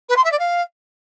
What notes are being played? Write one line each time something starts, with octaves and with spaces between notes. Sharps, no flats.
B4
C6
E5
D5
F5